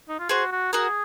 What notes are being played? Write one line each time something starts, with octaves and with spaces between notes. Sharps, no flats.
D#4
F4
F#4 G#4 C5
F#4
F#4 G#4 A#4